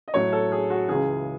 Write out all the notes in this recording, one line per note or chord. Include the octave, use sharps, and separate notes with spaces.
D#5
A2 F#3 A3 C#5
A4
G#4
F#4
C#2 C#3 E3 G#4